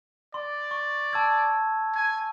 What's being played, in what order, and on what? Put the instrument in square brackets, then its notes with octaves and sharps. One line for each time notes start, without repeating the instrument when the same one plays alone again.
[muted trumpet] D5 [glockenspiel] C6
[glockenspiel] C#6
A5 E6 G#6
[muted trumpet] G#5 [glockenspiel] G#6